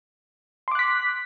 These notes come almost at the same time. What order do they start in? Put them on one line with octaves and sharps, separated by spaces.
C6 D6 F#6 B6